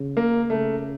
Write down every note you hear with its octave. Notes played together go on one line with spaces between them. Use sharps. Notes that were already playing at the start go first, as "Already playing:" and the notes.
Already playing: C#3
A#3
C#3 A3